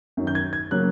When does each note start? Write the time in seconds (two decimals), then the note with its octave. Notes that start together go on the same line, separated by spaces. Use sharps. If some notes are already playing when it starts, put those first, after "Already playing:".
0.17 F#2 D#3 F#3
0.27 G6
0.35 G#6
0.53 G#6
0.71 C#3 F#3 A#3 C#4 F#6